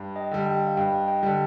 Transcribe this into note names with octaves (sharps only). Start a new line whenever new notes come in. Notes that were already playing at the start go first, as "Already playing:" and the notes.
Already playing: G2
D#5 G5
D3 G3
D#5 G5
F5
G2 D#5 G5
D#5 G5
D3 G3